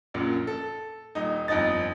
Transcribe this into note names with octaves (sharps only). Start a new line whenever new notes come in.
A#1 F#2 A#2
A4
D#1 D#4
G1 F2 D#4 D#5 A6